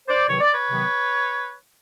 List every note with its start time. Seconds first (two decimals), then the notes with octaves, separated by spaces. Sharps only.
0.08 C5 D5
0.28 E2 C3 D#3 F#3 B3 C#5
0.41 D5
0.53 B4 C#5
0.70 C3 D#3 F#3 B3